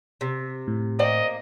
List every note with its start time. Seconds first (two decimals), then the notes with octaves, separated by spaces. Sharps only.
0.21 C3
0.68 A2
0.99 A#3 C5 D5 D#5 G5